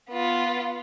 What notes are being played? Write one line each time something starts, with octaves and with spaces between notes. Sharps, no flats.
B3 F4